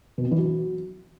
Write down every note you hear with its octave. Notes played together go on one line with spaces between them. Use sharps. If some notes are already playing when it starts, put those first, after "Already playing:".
B2
C4
E3
F#3